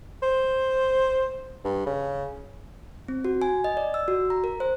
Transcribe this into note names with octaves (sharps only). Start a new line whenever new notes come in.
C5
G2
C#3
C4
F#4
G#5
D#5
D5
E6
F#4
A#5
A#4
C5